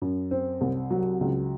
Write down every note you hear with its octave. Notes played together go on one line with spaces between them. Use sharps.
F#2
C4
C2
F#3
C#2